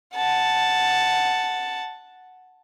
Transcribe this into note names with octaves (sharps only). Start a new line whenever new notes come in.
F#5 A5